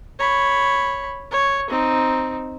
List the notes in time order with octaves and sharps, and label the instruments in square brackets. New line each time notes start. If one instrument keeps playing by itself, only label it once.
[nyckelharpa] C#5 B5
C#5
C4 D#4